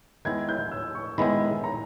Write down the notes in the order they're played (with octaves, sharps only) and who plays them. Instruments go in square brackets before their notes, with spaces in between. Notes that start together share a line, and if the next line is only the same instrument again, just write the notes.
[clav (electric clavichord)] D#3 G#3 B3 E4 [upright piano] G#6
[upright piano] G6
E6
C#6
[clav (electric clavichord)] D#3 G#3 B3 E4 [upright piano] B5
[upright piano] A#5